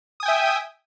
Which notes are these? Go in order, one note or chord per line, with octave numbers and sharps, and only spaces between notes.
E5 G5 G#5 D#6